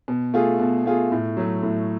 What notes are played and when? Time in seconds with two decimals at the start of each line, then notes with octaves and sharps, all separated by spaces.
0.08 B2
0.34 A3 F4 G#4
0.60 B2
0.86 A3 F4 G#4
1.12 A2
1.37 F#3 A3
1.63 A2